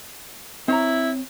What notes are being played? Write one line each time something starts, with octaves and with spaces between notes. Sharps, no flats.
C4 E4 C#5 A#5